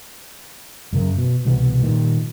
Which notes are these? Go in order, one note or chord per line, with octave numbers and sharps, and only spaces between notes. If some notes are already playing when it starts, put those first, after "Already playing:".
F#2 C#3 A#3
B2
C2 B2 E3 B3
A#2 D#3 G3